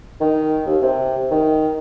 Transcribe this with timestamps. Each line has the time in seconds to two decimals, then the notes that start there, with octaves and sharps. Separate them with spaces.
0.20 D#3
0.66 D#2
0.82 C3
1.31 D#3